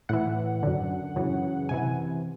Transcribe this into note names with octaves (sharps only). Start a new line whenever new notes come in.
A2 E3 F#5
F#2 D3
F#2 C#3 E3
C3 E3 G#5